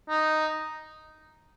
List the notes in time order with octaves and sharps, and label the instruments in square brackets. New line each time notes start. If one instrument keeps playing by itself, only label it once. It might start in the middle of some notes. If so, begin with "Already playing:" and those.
[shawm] D#4